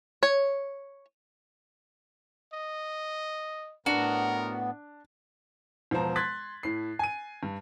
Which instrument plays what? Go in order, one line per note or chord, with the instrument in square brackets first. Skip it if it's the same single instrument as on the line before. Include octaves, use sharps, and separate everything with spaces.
[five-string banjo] C#5
[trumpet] D#5
[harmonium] A2 B3 [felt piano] D4 [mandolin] F#4 [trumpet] A#4
[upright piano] E1 F3 B3 C5 A#5
C6 F#6 G#6 A6 B6
A2 C7
G#5 D#7
G2